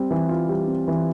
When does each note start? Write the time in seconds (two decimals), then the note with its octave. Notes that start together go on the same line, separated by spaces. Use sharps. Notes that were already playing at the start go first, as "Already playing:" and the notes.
Already playing: G3 C4
0.11 E3
0.29 F4
0.49 G3
0.67 C4
0.88 E3